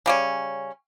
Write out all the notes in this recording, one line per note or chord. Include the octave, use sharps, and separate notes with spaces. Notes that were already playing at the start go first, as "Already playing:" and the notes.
C#3 G3 C#4